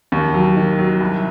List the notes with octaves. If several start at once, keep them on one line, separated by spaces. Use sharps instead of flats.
D#2
F#3
D#3
F#3
C2